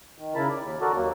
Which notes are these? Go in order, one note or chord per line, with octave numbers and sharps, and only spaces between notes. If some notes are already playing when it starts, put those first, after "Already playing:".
D#3
C#3 E4 A#4 A5 B5
D5
D#2
F#4 A4 A#4 D5
D#2 F#3 A#3